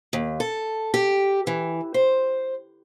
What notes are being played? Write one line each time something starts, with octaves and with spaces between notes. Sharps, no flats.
D#2
A4
G4
E3
C5